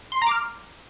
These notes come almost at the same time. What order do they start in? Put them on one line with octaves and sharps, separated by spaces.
C6 C7 A#5 D6 F6